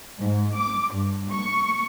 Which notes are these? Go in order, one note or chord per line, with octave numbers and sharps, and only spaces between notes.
G#2
D6
G2
C#6